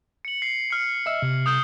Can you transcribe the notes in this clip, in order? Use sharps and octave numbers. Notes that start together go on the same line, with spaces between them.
C#7 F#7
C7
F6 C#7
D#5 E5 E6
C3
D#6 G6 G7